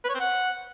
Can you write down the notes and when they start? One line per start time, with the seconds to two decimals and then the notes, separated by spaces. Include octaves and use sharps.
0.04 B4
0.10 C#5
0.15 C4
0.20 F#5